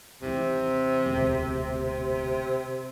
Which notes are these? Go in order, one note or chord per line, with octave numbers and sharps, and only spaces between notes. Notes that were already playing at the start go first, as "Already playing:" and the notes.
D#2 C3 E3
E1 D2